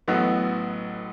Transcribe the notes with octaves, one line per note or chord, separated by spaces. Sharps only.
A1 A2 F#3 B3 F#4